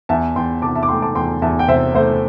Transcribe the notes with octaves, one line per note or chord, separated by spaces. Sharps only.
E2 E5 A5
E2 G5 C6
C3 A5 D6
E5 A5
D6
A3 G5 C6
A5 D6
E2 G5 C6
E2 E5 A5
G5
C3 C5 E5
A3 C5 E5